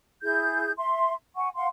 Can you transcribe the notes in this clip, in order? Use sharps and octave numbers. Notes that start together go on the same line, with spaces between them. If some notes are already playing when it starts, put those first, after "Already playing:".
E4 G#4 G6
E5 C6
F#5 G#5 C#6
F5 F#5 C6